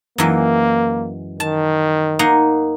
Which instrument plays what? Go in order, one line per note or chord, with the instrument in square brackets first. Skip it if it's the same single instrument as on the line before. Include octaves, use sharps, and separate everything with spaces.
[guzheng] F#2 E3 G#3 [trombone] A#3
[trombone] D#3 [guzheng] A5
[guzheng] A#3 D#4 F#5